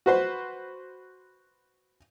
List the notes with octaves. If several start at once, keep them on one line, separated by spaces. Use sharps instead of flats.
F#4 B4 C5